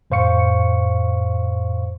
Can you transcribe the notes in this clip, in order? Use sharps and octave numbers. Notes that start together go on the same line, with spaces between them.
F2 A2 C5 F5 C#6 C#7